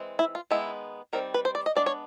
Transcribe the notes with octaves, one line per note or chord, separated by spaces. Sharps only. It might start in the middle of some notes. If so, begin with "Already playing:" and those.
Already playing: E3 G#3 C4
E4
F4
D#3 G#3 B3 D#4 E4
D#3 G3 C4 A#4
B4
C5
D5
D#5
G#3 B3 D4 D5
C#5